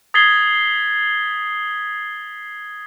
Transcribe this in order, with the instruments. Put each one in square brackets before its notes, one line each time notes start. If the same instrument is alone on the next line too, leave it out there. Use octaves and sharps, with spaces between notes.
[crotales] D#6 G#6 A6 B6 C7 G7